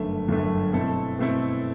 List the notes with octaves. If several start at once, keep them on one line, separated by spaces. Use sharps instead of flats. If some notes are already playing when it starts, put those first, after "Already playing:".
Already playing: G1 F#2 D3 A3
G1 F#2 D3 A3
B2 A3 C4 E4 A4
B2 A3 C4 E4 A4